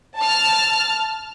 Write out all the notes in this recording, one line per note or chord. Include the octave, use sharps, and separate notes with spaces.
A5 F6